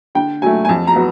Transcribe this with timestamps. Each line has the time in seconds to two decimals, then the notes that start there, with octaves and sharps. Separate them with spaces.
0.15 D3 G5
0.42 F#3 A3 G#5
0.65 G#5
0.69 F2 A5
0.87 A#5
0.96 F#3 B3